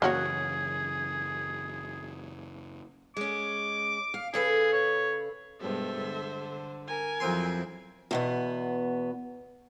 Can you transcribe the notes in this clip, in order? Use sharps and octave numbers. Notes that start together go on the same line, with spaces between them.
F#2 C#3 E3 A#3 F#4 G#4 C#5
G#3 C#4 D6
F5
C#3 G#4 A4 B4
C#5
G2 B2 G#3 A4 C5 E5
D3
A#4 G#5
F2 F#3 C4 E4 C6
E2 B2 B3